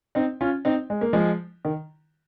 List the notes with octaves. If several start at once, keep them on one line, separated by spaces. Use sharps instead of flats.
C4 D#4
C#4 F4
C4 D#4
G#3
A#3
F3 G#3
D#3